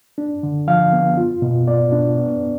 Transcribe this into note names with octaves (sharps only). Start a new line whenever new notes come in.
D4
D3
F3 F5
B3
F4
B2
B3 D5
D4
B3